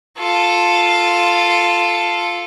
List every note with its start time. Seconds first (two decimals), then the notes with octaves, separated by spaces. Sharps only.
0.18 F4 A4